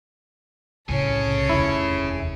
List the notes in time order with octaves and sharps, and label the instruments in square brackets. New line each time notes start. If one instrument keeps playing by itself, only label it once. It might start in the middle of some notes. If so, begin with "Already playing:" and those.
[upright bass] C2 A2 [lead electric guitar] C#4 G#4 [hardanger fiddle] A4 C#5
[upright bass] F1 D#2 [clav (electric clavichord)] E4